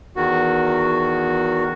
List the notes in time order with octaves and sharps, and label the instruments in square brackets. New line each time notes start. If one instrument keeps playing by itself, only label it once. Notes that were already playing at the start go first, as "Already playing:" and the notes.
[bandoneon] E2 D#3 F#4